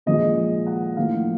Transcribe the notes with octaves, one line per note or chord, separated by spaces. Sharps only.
A#2 F3 G#3 D#5
F#5
A2 F3 A#3 F5